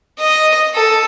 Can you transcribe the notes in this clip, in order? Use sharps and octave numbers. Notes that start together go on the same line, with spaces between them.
D#5
A4